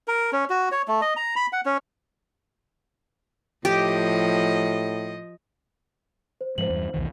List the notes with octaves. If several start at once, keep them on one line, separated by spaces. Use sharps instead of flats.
A#4
C#4
F#4
C#5
A3
D#5
A#5
B5
F#5
C#4
A2 F3 G4 D#5
C5
G#2 F3 C5 F#7
E2 G2
B1 E2 D#3